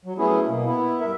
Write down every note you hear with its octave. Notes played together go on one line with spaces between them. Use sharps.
F#3
F#3 A3 B3 C#4 E4 G#4
B2 A#3
B3 E4
G2 A#4 E5